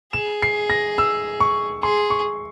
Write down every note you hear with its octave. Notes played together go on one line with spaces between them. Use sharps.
G#4 E7
C7
A#6
E6
C#6
G#4 C6
C#6